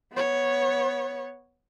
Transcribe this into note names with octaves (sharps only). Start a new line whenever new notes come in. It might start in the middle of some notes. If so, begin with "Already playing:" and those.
B3 C#5